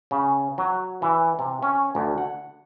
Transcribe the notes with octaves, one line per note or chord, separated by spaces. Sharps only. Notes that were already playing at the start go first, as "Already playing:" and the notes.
C#3
F#3
E3
C3
C#4
D2
F#5